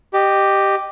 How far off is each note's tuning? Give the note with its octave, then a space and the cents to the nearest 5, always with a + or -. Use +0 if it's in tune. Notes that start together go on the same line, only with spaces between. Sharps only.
G4 +0 D#5 -20